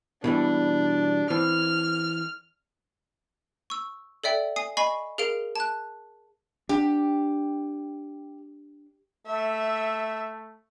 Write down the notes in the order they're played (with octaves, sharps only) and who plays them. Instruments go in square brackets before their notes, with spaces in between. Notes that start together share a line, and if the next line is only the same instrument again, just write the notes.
[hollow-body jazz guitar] B2 E3 G3 [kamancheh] D4
[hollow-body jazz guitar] E3 C4 [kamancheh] F6
[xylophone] C#6 E6
A4 D5 E5 G5
G#5 D#6 C7
D#5 G#5 B5 C#6 C7
G#4 A#4 F5 D7 F7
A5 F#6
[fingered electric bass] D4 [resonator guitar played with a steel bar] G4
[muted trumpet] A3 [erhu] E5